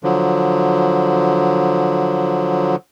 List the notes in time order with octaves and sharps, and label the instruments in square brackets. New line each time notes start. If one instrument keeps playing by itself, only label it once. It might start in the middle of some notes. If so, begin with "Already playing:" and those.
[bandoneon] D3 F3 F#3